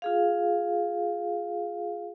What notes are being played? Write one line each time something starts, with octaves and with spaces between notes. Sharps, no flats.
F4 G#4 F5